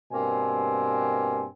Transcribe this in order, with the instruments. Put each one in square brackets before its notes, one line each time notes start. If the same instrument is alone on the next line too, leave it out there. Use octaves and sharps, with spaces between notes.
[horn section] G2 B2 A#3 C4 G#5